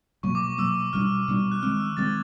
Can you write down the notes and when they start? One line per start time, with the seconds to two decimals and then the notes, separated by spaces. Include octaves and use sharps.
0.23 B2 F#3 A#3 C#6
0.35 D6
0.58 B2 F#3 A#3 E6
0.93 B2 G3 B3 D4 F6
1.28 B2 G3 B3 D4
1.52 F#6
1.62 D#3 G#3 C4 F6
1.80 E6
1.97 D#3 G#3 C4 A6
2.06 G#6